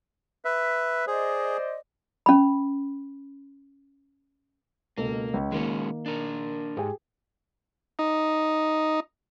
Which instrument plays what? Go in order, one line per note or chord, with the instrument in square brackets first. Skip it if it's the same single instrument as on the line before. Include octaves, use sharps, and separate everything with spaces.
[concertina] B4 E5
[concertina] G#4 [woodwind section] C5 D5 D#5
[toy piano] C#4 B5
[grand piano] C#2 B2 A4 [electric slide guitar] A#3
[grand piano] C#2
[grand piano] D#3 A#3 [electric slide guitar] G#3 C#4 F#4
[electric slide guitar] D4 A#4
[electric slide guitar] G#2 [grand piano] G4 G#4 G5
[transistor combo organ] D#4